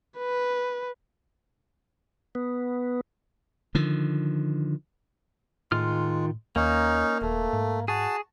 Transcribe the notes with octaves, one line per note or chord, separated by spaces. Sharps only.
B4
B3
D3 D#3 F3
A2 D#3 G#3 F4 F6
D#2 A#3 C#4 D#4
D#1 A3
G#2
F#4 G#4 A5